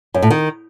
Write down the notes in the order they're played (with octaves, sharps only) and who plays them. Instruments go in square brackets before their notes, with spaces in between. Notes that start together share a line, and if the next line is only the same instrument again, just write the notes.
[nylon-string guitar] F#2
A2
D#3